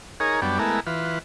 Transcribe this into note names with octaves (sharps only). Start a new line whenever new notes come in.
D#4 G#4 A#4 C#5
F#2 G3 B3 D4
G#3 A3 B3 E4 A#4
E3 F4 B4